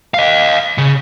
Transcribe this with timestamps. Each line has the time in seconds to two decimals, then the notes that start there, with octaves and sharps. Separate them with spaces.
0.14 D#5 F5
0.78 C#3